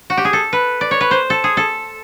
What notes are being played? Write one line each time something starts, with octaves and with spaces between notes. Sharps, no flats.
F#4
G4
G#4
A4
B4
D5
C#5
B4
C5
A4
G#4
A4